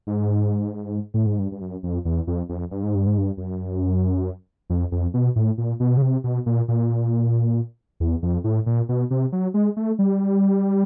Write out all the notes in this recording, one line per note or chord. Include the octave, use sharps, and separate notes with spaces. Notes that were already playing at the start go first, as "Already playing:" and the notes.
G#2
A2
G#2
G2
G2
F#2
F2
E2
F2
F2
G2
G#2
G2
G#2
G2
F#2
F2
F2
B2
A2
A#2
B2
C#3
C3
B2
A#2
A#2
E2
F2
A2
A#2
B2
C3
F#3
G#3
A3
G3